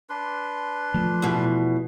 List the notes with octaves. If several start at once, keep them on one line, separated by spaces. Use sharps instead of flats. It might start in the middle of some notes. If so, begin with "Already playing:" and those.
D4 B4 C6
F3 A3
E2 B2